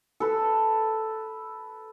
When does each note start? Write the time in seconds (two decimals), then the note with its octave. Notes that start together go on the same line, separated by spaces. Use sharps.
0.20 A4 B4